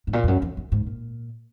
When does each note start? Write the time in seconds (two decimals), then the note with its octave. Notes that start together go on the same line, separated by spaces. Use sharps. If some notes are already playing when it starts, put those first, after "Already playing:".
0.07 G#2
0.13 A#2
0.24 F2
0.28 F#2
0.42 F2
0.57 F#2
0.72 G#2
0.86 A#2